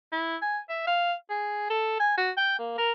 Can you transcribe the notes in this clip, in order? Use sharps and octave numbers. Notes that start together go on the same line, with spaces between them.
E4
G#5
E5
F5
G#4
A4
G#5
F#4
G5
A#3
A#4